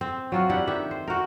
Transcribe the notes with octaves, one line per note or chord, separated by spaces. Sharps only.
C4
F#3 F4 F#4
D4 E4 G4 F#5
D#3 G4 E5
C5
F#4 A#4